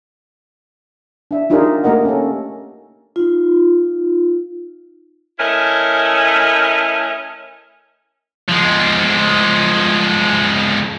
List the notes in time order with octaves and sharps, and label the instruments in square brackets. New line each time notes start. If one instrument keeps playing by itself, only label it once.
[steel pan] D4 E5
D4 D#4 F4 G4 G#4 A#4
A3 A#3 G4 A#4 D#5 F#5
C#4 A4
[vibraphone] D#4 F4
[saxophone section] A3 C#4 E4 A#4 D#5
[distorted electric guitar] F3 G#3